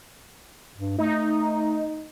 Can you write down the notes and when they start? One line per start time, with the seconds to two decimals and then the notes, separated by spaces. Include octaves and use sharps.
0.77 G2
0.98 A3 D#4